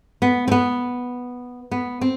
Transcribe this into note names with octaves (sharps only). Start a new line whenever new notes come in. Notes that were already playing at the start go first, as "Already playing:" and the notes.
B3
C4
B3
B3
C4